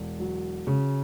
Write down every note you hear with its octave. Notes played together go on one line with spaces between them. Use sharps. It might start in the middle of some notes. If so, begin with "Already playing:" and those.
Already playing: E1
F#3
C#3